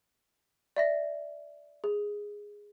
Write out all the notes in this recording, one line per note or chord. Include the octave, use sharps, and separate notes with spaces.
D5 E5 A#6
G#4